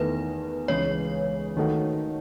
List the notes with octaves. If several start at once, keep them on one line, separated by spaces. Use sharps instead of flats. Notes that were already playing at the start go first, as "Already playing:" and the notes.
Already playing: E2 D#3 A3 E4 B4
C#2 C#3 E3 G#3 C#4 C#5
D#3 A3 D#4 F#4